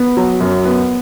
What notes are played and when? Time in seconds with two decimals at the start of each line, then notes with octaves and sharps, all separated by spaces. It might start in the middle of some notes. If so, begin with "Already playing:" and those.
Already playing: B3
0.17 F#3
0.40 F#2
0.65 B3